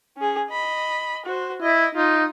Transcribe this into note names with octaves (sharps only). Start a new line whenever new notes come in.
C#4 G#4
D#5 B5
F#4 C5
E4 D#5
D#4 F4